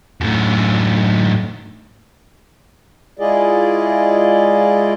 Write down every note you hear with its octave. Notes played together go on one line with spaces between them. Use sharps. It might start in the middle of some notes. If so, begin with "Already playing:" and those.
F#2 A2
G#3 E4 F4 G#4 D5 D#5